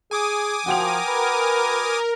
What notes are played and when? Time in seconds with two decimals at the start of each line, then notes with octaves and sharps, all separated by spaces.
0.11 G#4 G#5 D6 D#6
0.66 F3 F#4 A#4 G5 F7
1.08 B4